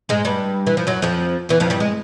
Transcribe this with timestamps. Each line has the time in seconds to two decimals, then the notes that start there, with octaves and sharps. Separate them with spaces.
0.09 G#2 G#3
0.25 G2 G3
0.67 E3
0.77 F3
0.87 F#2 F#3
1.02 F2 F3
1.49 E2 E3
1.60 F2 F3
1.70 G2 G3
1.80 G#3